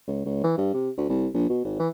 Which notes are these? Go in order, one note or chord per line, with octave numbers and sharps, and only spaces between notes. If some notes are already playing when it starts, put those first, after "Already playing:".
C#2
C#2
E3
G2
C3
D2
C2
A#1
B2
G#1
E3